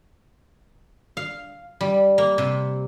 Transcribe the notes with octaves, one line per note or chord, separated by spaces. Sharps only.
F5
G3
A#3
C3